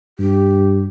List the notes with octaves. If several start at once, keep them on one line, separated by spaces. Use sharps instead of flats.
G2 G4